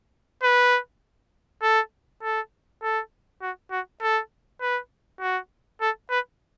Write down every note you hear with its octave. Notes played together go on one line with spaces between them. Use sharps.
B4
A4
A4
A4
F#4
F#4
A4
B4
F#4
A4
B4